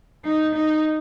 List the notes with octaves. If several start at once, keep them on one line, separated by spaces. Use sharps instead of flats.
D#4
D#4